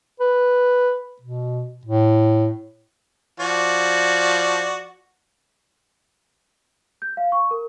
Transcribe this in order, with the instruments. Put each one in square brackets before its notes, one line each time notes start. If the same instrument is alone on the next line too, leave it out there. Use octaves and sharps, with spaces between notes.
[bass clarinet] B4
B2
A2
[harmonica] F3 F#4 D5
[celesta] G6
F5
C#6
A#4